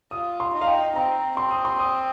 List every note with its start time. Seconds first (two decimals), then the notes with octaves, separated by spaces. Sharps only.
0.11 F4 D#6
0.40 C6
0.53 D#4
0.61 F5
0.67 G5
0.95 C4 A#5
1.37 C4 C6
1.51 D#6
1.65 C6
1.79 D#6